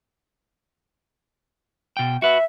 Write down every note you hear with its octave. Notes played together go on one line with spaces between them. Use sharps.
B2 G5
F#4 B4 E5